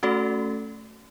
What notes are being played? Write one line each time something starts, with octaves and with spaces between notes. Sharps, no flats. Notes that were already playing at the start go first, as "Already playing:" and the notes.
A3 C#4 F#4 A4